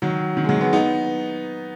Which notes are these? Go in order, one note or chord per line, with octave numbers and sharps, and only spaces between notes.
D#3 F#3
D#3
G#3
D#3 F#3
G#3 B3
B3 D#4